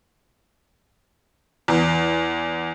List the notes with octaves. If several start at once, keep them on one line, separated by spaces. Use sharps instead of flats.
E2